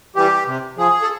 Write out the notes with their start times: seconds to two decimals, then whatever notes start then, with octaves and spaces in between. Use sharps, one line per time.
0.16 E3 G3 G4
0.47 C3
0.77 F3 G#4
1.02 A4